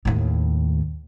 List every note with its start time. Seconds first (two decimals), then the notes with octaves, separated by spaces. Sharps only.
0.05 D#2 A2